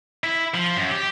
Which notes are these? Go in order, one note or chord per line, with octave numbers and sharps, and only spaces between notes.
E4
F3
F#2
G4